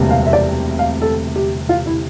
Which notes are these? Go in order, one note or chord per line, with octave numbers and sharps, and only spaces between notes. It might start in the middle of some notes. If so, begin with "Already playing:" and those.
Already playing: E1 D2 C3 G3 A#3
F5
E5
D5
F5
A4
G4
F4
E4